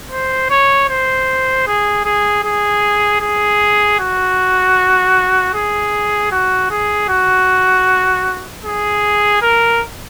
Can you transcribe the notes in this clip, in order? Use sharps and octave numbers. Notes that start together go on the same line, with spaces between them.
C5
C#5
C5
G#4
G#4
G#4
G#4
F#4
G#4
F#4
G#4
F#4
G#4
A#4